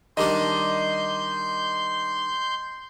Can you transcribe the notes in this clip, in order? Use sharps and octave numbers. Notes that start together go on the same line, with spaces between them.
D#3 G3 D4 D#5 C6 G6